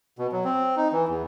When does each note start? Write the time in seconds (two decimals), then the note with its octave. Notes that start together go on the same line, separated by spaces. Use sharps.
0.19 B2
0.32 F#3
0.45 C4
0.76 D#4
0.92 E3
1.09 E2